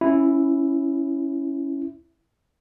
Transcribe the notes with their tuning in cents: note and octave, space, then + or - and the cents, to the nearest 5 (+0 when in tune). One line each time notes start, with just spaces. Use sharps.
C#4 +0 E4 +0